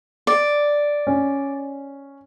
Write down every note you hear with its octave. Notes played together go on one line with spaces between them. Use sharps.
D5
C#4